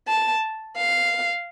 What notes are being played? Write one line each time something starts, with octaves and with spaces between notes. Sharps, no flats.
A5
F5